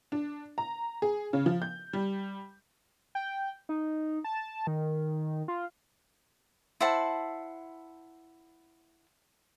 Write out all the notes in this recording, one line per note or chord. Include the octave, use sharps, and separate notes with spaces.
D4
A#5
G#4
C#3
F3
G6
G3
G5
D#4
A5
D#3
F4
E4 C5 F#5 A5